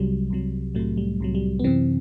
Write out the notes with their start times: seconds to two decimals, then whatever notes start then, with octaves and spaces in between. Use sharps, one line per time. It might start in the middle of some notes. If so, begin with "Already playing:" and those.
Already playing: C2 C3 F#3 G3
0.30 C2 C3 F#3
0.75 C2 A2 C3 F#3 A3
0.97 G3
1.20 C2 C3 F#3
1.35 G3
1.59 B3
1.64 F#2 C3 E3 C4